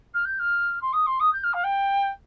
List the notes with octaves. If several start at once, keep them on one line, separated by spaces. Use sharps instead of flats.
F6
G6
F6
C6
D#6
C6
D#6
G6
F6
F5
G5